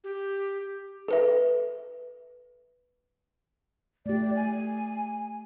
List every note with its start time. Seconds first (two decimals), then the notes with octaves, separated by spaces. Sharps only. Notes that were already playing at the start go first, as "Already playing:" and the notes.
0.04 G4
1.08 A4 B4 E5
4.06 A3 G4 D5
4.36 G#5